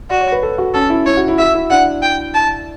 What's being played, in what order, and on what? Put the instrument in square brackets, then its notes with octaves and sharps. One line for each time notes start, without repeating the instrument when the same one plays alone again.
[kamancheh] F#4 [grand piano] D5
[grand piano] C#5
B4
A4
F#4
[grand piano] C#4 [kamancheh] A4
[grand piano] E4
[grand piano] E4 [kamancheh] C#5
[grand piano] F#4
E4
[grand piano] F#4 [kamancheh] E5
[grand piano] E4
[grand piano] D4 [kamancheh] F#5
[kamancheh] G5
A5